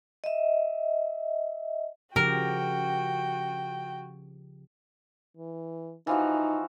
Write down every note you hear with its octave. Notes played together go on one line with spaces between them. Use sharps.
D#5 E5
C#3 F3 F#4 G4 A#4 G5
E3
E3 F3 D#4 F#4